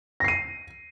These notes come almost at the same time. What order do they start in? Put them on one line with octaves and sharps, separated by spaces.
A#6 C7 D#7